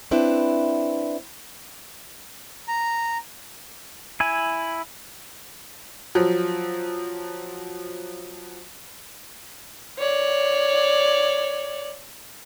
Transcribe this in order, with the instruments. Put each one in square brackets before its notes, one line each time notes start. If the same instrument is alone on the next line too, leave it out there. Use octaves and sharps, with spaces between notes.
[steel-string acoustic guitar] C4 D4 E4 B4
[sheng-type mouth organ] A#5
[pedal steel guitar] E4 G#5
[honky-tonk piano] F3 F#3
[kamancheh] C#5 D5